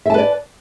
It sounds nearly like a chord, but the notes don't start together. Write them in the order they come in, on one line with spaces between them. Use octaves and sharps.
E5 A5 B4 D5